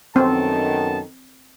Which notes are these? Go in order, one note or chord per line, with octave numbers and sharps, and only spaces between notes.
F#2 D#3 B3 C4 A4 A5